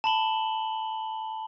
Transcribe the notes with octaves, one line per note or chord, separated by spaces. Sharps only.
A5 B5 F#7 G7